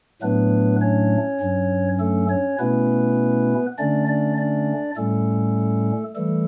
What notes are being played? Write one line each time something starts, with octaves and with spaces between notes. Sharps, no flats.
A2 F#3 A3 B3 D4 B4
C#4 C#5
G2 F#3 C#4
A3 A4
C#4 C#5
B2 A3 B3 C#4 E4 B4
D3 A3 C#4 D4 D5
D4 D5
D4 D5
A2 G3 A3 C#4 A4
E3 G3 A3 A4